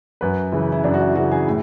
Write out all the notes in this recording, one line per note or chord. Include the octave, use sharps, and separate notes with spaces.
F#2 B4
C#3 E3 E4
E4
F#2 D4
F#4
E4
C#3 E3 F#4
G#4
A2